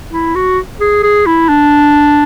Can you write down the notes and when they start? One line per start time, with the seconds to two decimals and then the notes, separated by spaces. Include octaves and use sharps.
0.12 E4
0.35 F#4
0.80 G#4
1.03 G#4
1.26 E4
1.49 D4